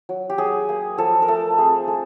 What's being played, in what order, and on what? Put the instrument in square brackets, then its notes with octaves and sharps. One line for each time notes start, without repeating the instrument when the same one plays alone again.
[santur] F#3
G4
F#3 G#4
A#3
F3 A4
A#4
A3 A4
C4 G#4
G#3 A4